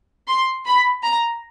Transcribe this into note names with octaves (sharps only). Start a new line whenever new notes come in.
C6
B5
A#5